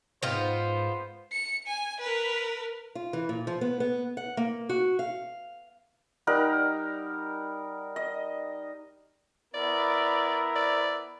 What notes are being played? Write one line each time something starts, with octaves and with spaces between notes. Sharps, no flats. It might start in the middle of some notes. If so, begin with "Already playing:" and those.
G#2 B3 F4 C5 D#5 F5 G5
C#7
G#5
A#4 B4
F4
E3
A#2
F3
B3
B3
F#5
A#3
F#4
F5
G3 D#4 A#4 F#5
D#5
B3 E4 A#4 D5
D5